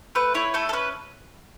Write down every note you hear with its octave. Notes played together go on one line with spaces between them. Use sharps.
A3 B4
E4 C#5
A3 A4
A4
C#4 B4